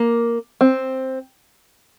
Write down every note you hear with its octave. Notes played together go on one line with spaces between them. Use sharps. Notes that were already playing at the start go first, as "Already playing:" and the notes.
Already playing: A#3
C4